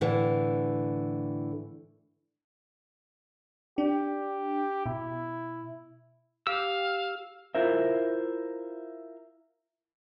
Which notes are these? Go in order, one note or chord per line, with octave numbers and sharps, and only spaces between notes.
A2 D3 E3
D4 G4
B2 E4
G4 F5 E6
E4 F4 A#4 C5 E5